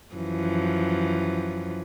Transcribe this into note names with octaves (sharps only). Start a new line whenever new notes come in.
F#2 E3 F3